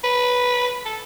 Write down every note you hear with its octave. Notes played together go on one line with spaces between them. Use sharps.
B4
A4